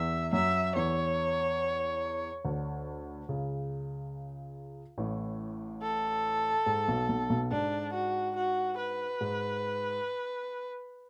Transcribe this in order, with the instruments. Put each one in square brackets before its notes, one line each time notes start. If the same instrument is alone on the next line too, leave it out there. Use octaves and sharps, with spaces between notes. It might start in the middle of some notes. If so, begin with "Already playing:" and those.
Already playing: [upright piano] E2 E3 [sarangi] E5
[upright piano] F#2 F#3 [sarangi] E5
[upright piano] E2 E3 [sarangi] C#5
[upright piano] D2 D3
C#2 C#3
A1 A2
[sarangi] A4
[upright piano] G#2
B1 B2
B1 B2
B1 B2
[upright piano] G#2 [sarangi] D4
[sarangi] F#4
F#4
B4
[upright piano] G#2